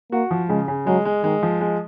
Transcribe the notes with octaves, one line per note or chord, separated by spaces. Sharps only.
A#3 F#4
F3
C#3 G#3
C#3
F#3 G#3
G#3
D#3 G#3
F3
G#3